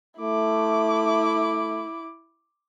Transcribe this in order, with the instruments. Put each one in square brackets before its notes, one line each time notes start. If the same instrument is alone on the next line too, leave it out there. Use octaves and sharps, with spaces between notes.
[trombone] A3 [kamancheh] E4 D6